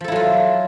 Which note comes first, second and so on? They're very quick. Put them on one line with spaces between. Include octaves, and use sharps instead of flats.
F3 A4 E4 F#3 F4